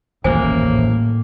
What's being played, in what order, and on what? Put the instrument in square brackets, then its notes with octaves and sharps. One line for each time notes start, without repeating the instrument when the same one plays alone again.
[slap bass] D#1 A1 F#2 [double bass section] A2 [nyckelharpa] A#3 [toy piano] C5 G#5